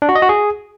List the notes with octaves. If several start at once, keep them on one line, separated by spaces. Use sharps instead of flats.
D4
F#4
D#5
F#4
G#4